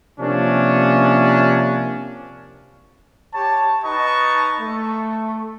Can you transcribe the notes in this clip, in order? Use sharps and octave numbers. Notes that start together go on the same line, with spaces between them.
C3 F3 A#3 C#4 D4
G4 C#5 A5
D#4 B4 D#5 A5 C#6
A3